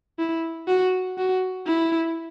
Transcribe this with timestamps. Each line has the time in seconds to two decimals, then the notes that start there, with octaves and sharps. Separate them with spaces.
0.19 E4
0.68 F#4
1.18 F#4
1.66 E4